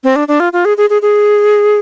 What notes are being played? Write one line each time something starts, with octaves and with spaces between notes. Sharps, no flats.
C4
D4
D4
F4
F4
G#4
G#4
G#4
G#4